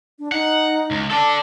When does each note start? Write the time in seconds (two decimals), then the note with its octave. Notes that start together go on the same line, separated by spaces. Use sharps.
0.19 D4
0.32 D#4 F#5
0.91 C#2
1.10 A4 D5 A5